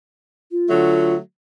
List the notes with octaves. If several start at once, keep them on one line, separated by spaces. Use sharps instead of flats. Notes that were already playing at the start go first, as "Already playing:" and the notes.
F4
D3 F#3 A3